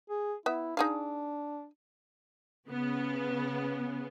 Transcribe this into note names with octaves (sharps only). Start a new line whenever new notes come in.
G#4
B3 E4 E5
D4 D#4 G#4 F5
C#3 B3